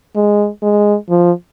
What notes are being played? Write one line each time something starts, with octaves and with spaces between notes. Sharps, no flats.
G#3
G#3
F3